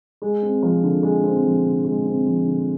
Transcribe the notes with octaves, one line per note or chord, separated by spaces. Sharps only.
G#3
C4
F3
D3
G#3
C4
F3
D3
G#3
C4
F3
D3